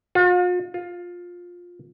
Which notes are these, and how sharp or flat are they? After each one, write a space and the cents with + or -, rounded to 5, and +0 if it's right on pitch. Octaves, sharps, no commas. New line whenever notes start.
F4 +45
F4 +15